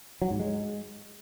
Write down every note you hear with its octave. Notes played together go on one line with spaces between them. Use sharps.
F#3
G#2
G#3